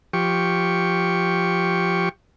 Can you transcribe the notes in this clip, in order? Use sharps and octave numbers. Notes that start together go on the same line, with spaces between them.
F3 G4 C#6